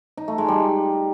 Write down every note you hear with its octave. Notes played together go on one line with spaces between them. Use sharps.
D#4
A3
G#3
G3